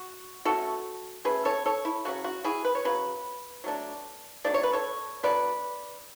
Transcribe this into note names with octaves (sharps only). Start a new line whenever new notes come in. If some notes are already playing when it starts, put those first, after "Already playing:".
Already playing: F#4
B2 A3 C#4 F#4 A4
B2 A3 C#4 G#4 B4
A4 C#5
A4 C#5
E4
C#3 F#3 A3 C#4 F#4
F#4
E4 G#4
B4
C#5
C#3 F#3 B4
F#3 A3 D4
F#3 A3 D4 D5
C#5
B4
A4 C#5
D3 F#3 B3 B4 D5